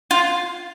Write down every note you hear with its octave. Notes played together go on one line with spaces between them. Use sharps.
F4